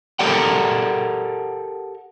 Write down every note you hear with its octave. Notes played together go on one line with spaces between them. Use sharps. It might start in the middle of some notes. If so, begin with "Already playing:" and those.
G4 A4 A#4 D5 F#5 G5